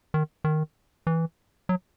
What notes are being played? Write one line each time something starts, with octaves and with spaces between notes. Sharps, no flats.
D#3
D#3
E3
F#3